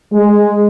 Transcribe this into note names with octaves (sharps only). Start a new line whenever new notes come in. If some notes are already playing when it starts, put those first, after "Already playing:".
G#3